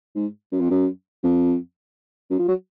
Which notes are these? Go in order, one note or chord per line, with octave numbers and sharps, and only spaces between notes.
G#2
F#2
F2
F#2
F2
F#2
F3
F#3